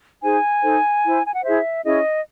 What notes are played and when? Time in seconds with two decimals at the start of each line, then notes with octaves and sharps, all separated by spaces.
0.22 D#4 G#4 C5 G#5
0.63 D#4 A4 C5
1.03 E4 C5
1.27 G#5
1.35 F#5
1.44 E4 G#4 C5 E5
1.84 C#4 E4 G#4 D#5